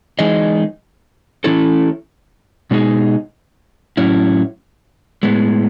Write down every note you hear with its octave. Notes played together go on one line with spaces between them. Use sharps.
E3 G#3 D#4 G#4 D#5
E3 A3 C#4 E4 A4
B2 G#3 D#4 G#4
A2 F#3 C#4 E4
A2 G#3 B3